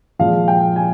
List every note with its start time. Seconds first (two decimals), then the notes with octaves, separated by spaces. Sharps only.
0.19 A#2 F3 G#3 F5
0.48 G5
0.76 G#5